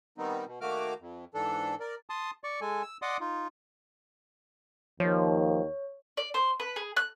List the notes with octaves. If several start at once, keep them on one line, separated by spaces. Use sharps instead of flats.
D#3 G3 B3 C4 D#4
B2
D#3 A3 A#3 F#4 D6 F6
F2
G#2 E3 D4 A4
A#4 D5
A5 C6 D#6
D5 C#6
G#3 A4 G#5
E6
D5 D#5 F#5 C6 D6 D#6
D#4 F4
D#2 F3 C#5
D5
C5
B4
G#4
F#6